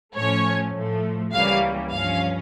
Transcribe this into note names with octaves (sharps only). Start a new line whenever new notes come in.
A2 F3 A3 C#4 C#5
A2 F3 A3
C#2 C#3 E3 G3 A#3 F5
G2 F3 C#4 F5